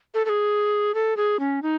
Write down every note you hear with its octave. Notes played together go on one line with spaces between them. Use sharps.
A4
A4
G#4
A4
G#4
C#4
D#4